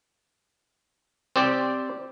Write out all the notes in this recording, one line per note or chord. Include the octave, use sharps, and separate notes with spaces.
C4 G4 D5